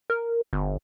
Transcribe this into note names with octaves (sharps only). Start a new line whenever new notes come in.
A#4
G1